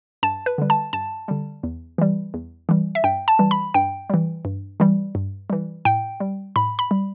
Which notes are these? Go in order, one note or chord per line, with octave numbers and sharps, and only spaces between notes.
G2 A5
B4
D3 G3
A5
G2 A5
D3 G3
E2
E3 G3
E2
E3 G3
E5
G2 G5
A5
E3 G3
B5
G2 G5
E3 G3
G2
E3 G3
G2
E3 G3
A2 G5
G3
A2 B5
B5
G3